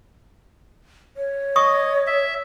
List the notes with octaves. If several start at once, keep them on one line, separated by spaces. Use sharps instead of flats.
C#5
D#5 C#6 D#6
E5